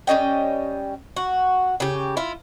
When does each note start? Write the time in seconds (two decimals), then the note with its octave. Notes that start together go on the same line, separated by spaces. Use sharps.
0.07 G3 C#4 D#5 G5
1.16 F#4
1.80 C#3 G4
2.17 E4 F4